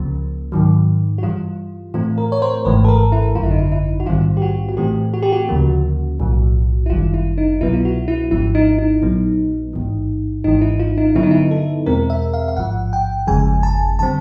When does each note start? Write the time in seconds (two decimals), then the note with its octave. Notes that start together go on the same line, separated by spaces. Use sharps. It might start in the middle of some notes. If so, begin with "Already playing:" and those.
Already playing: C#2 C#3 F3 A#3
0.52 G#2 D#3 F#3
1.18 F#4
1.23 G2 E3 G3 F4
1.94 A2 E3 A3 C4 F4
2.18 A#4
2.32 C#5
2.42 C5
2.65 G#1 G#2 E3 A3 B4
2.85 A4
2.88 A#4
3.12 E4
3.35 G#1 F#2 D3 F4
3.43 E4
3.51 D#4
3.59 E4
3.72 E4
4.00 F#4
4.07 A#1 G#2 D#3 G3 C4 F4
4.37 G4
4.42 F#4
4.69 F#4
4.77 A2 E3 A3 C4 G4
5.14 F#4
5.23 G4
5.32 F#4
5.49 D2 C#3 F3 A#3
6.20 B1 A2 F3
6.86 E4
6.90 G1 F#2 D#3 G3 F4
7.14 E4
7.38 D#4
7.61 C2 B2 F#3 B3 E4
7.73 F4
7.85 F#4
8.08 E4
8.31 G#1 G#2 F3 E4
8.55 D#4
8.78 D#4
9.02 A#1 A#2 F#3 B3
9.73 A1 G#2 E3
10.44 G#1 G#2 E3 D#4
10.61 E4
10.79 F4
10.98 D#4
11.15 G2 D3 F#3 B3 E4
11.23 D#4
11.31 E4
11.51 A4
11.86 E2 B2 G#3 C4 A#4
12.10 E5
12.33 F5
12.48 F5
12.57 A1 G#2 F3 F#5
12.93 G5
13.27 G1 F2 C#3 F3 G#3 G#5
13.63 A5
13.99 D3 G3 C4 A5